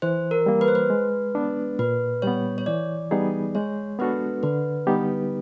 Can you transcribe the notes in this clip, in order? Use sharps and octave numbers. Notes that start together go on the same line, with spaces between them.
E3 C5
A#4
G3 A#3
B4
C5
B4
G#3
B3 D4
A#2 B4
G3 B3 C#5
C#5
E3 D5
G3 B3 D#4 G#4
G#3 C#5
B3 D4 F#4 A4 B4
D3 B4
G3 B3 D#4 G4